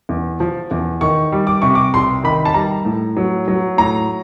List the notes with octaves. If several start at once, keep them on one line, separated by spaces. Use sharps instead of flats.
E2
F3
E2
D#3 C#6
G3
D6
C3 C#6
D6
C2 C6
D#3 B5
A5
G3 A#5
A2
F#3
F#3
A2 A#5